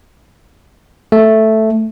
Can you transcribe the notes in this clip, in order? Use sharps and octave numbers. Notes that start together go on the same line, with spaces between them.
A3